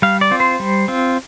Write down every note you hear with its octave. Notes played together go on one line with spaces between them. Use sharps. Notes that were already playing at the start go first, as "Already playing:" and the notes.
G3 F5
D5
C4 F4
C5
G3
C4 F4